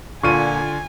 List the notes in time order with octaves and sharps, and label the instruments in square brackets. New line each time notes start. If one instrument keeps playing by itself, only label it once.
[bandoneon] A#2 [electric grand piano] D3 F4 [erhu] G#5 [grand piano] C#6 F6 D#7